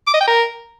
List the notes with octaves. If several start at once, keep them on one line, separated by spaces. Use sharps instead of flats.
D6
D#5
G5
A#4